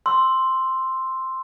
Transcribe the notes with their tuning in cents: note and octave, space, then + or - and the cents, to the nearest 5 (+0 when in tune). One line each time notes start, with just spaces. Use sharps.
C6 +0 E6 +0